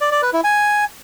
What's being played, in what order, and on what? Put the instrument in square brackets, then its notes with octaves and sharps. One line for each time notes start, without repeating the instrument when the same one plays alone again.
[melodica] D5
D5
B4
E4
G#5